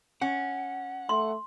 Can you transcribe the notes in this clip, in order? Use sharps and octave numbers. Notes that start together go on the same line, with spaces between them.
C#4 F#5
A3 C6